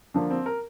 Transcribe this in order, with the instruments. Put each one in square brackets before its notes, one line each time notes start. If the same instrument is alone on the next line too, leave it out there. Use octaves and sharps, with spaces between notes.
[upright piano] D3 F3 A#3 D4
C4
A#4